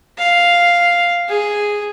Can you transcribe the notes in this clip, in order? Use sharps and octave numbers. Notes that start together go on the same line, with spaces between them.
F5
G#4